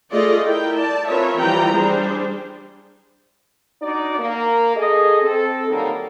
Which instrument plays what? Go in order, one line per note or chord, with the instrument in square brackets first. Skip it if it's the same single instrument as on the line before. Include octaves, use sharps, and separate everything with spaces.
[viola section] A3 F4 G#4 D5 D#5
E4 A#4 G5
D5 A5
C4 F4 A#4 B4 C#5 E5
E3 F3 G3 B4 G5 A#5
G3 D4 G#4 C5
[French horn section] D4 D#4 F#4 D5
A#3
G#4 A4 D#5
C4 A4
D3 D#3 F#3 G3 A#3